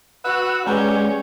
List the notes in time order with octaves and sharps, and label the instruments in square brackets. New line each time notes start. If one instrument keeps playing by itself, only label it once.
[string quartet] F#4 [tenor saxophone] B4 [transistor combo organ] F#5 E6
[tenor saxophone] G3 [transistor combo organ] G#3 [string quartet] C#4 [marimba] B4 F#5 A#5